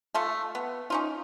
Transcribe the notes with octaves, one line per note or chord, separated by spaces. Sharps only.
A3 F4 A4
B3
C#4 D#4 F4